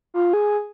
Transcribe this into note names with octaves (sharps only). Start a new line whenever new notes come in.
F4
G#4